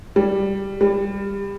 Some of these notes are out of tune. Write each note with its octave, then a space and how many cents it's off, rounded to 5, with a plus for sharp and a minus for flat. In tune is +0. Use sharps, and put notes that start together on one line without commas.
G3 +0
G3 +20